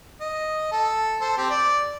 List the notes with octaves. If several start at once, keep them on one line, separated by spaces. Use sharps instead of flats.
D#5
A4
A4 C5
C4 G4
D5